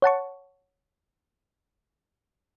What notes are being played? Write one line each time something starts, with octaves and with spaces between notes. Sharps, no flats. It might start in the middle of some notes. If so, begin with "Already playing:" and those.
C#5 F#5 A5 C#6